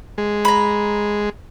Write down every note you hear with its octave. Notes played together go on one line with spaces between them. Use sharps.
G#3
A#5 B5